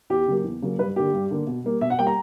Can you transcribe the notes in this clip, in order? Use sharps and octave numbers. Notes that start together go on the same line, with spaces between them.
E2 G4
C#3 F#3 A#3
E2
C#3 F#3 A#3
G2 B4
D3 A#3 G4
G2
D3 A#3
B2
G3 A#3
B2 E5
F#5
G3 A#3 G5
A#5